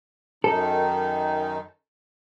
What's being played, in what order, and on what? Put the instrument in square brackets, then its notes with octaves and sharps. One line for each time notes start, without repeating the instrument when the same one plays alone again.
[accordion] F#2 D#3 D#4 [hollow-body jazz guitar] A4